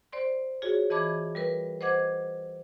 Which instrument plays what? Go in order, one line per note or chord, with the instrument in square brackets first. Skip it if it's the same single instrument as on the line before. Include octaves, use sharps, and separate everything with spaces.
[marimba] C5 D5 C6
F4 F#4 G#4 C#5
E3 D#5 A5 B5 D6 G#6
G3 A#4 B4
C5 D#5 F#5 D6 G#6